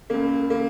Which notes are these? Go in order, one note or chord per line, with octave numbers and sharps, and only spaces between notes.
C#2 C#3 A#3
C#3 A#3